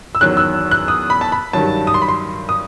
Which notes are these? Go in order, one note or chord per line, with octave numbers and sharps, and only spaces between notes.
E6
E2 D#3 F#3 F#6
E6
F#6
D#6
B5
A5
B5
G2 D#3 F#3 A5
D#6
C6
B5
C6
D#6